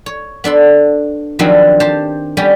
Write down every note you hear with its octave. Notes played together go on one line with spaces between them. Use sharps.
C#5
B3 D4 A4 C6
D#3 F3 F#3 B3 C4 D4
G4 C5 A5
G3 B3 C#4 G4